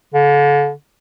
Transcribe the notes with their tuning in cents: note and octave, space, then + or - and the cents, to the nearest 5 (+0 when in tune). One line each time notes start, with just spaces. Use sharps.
D3 -35